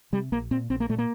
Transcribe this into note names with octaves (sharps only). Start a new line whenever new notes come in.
C3 G3
A#1 A#3
A#2 C4
A#1 C4
A#3
A#2 A3
A#3